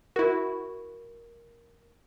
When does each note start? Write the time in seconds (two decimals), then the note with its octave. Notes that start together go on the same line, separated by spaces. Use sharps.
0.16 E4 F#4 A#4